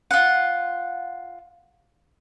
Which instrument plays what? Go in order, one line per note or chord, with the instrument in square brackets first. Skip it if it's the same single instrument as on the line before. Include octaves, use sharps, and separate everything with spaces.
[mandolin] F4 F#5